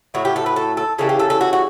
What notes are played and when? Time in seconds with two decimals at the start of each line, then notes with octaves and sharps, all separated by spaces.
0.14 A2 F#3 A3 F#4
0.25 G4
0.36 A4
0.46 B4
0.56 A4
0.77 A4
0.99 C#3 E3 G3 A4
1.09 G4
1.20 A4
1.30 A4
1.41 F#4
1.53 F#4